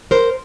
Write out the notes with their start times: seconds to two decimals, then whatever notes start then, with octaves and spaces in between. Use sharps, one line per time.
0.11 A#4 C5